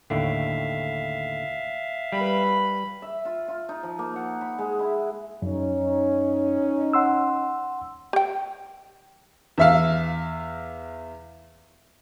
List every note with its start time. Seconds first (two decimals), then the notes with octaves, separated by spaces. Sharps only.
0.10 D#2 A2 D3 E5 F5
2.12 G3 B4 B5
3.02 E5
3.25 F4
3.48 F4
3.69 D#4
3.83 F3
3.99 A#3
4.16 F#5
4.41 B5
4.58 G#3
4.79 E4
5.42 F#2 C#4 D#4
6.93 F#5 C6 E6
8.13 G4 G5
9.58 E2 E5 F5